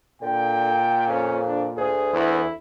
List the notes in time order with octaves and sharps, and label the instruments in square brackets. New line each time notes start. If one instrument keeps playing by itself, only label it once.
[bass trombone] A#2 [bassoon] D3 [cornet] G5
[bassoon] F2 [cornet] C#4
[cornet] D4
[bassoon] D2 [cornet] G#4
[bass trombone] E2 [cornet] E4